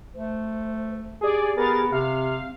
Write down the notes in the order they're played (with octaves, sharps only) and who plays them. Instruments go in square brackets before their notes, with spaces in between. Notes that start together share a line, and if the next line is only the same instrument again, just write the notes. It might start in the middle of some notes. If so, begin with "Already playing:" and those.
[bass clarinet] A3 [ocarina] C5
[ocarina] G4 [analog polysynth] G#4 D5
[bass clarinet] B3 [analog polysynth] G#4 A#4 A6
[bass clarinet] C3 [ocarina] C4 [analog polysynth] F5